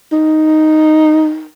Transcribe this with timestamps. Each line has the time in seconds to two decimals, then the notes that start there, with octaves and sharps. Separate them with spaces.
0.12 D#4